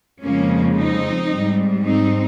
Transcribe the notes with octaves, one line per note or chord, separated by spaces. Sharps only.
F2 C#3 F3 G#3 A#3 C#4
C4 D#4
G#2 G3
C4 D#4